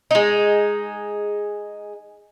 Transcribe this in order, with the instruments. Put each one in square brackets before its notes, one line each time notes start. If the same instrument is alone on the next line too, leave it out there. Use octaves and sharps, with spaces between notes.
[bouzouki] G#3 D#4